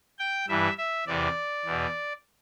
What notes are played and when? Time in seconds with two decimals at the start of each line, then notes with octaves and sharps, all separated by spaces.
0.19 G5
0.48 G2 E3 E5
0.78 E5
1.07 E2 C3 E3 D5
1.65 E2 B2